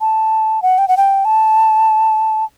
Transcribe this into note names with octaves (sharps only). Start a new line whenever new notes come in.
A5
F#5
G5
F#5
G5
A5